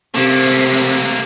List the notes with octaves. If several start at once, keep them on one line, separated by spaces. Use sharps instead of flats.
C3 A3 A#3